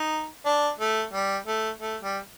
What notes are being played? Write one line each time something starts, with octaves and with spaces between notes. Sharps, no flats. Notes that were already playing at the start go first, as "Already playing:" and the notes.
Already playing: D#4
D4
A3
G3
A3
A3
G3